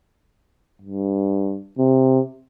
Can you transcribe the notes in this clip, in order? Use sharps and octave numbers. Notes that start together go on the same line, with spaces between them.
G2
C3